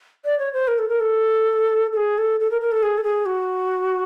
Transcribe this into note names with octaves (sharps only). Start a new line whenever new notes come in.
D5
C#5
C5
A#4
A4
A#4
A4
A4
G#4
A4
A4
A#4
A#4
A4
G#4
A4
G#4
F#4